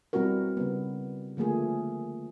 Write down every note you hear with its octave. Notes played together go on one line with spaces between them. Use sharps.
B2 G3 C4 E4 F#4 A#4
C#3 G3 B3
D3 F3 A3 A#3 G#4